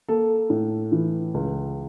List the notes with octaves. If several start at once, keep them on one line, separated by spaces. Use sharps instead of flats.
A#3 A4
A2
E3
C#2